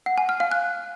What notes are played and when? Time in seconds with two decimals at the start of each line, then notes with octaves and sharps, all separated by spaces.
0.06 F#5
0.18 G#5
0.29 F6
0.40 F5
0.52 F#6